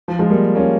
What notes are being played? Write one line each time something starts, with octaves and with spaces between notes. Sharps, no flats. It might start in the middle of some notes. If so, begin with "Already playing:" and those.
F3
F3 G#3
G3 A#3
A#3 C#4